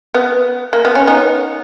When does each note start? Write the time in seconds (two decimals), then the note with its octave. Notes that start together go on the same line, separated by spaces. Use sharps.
0.14 B3
0.73 A#3
0.85 B3
0.95 C#4
1.07 B3 D#4